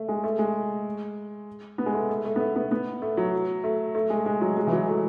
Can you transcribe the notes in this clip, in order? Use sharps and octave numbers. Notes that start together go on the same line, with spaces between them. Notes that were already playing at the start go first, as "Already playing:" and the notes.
Already playing: A3
G#3
A3
G#3
B3
G#3
A3
A3
A3
B3
A3
B3
B3
A3
F#3
A3
A3
G#3
G#3
F#3
G#3
E3
F#3
A3